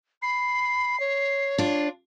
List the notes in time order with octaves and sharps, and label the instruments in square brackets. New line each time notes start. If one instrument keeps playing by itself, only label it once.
[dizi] B5 [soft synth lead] C7
[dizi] C#5
[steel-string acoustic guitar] D4 F4